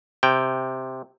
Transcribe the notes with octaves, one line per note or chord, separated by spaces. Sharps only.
C3 G5